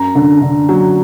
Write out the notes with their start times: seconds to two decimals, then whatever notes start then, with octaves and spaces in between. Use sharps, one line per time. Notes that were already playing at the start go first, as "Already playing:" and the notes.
Already playing: F#2 A#5
0.15 D3
0.42 D3
0.69 F#3